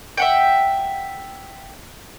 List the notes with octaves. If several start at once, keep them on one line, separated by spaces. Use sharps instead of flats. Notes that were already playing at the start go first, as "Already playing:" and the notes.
E5 F#5 G5